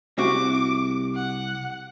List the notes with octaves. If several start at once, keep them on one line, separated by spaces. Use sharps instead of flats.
C2 C3 F#4 D6
F#5